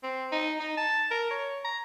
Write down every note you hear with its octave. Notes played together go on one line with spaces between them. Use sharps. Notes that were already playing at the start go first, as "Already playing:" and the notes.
C4
D#4
D#4
A5
A#4
C#5
A#5